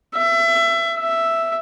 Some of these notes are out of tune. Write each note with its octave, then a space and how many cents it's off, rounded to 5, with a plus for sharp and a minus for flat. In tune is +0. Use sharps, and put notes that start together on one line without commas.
E5 +25
E5 +5